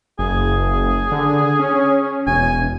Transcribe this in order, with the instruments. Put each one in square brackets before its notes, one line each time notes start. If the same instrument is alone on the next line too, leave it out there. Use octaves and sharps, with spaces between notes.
[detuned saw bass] F#1 [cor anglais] G#4
[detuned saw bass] D3
C#4
[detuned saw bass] E1 [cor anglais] G#5